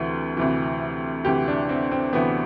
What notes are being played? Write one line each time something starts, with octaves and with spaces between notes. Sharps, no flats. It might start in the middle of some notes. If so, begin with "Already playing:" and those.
Already playing: D2 C3 E3
D2 C3 E3
D2 C3 E3 G4
D4
C4
C4
D2 C3 E3 B3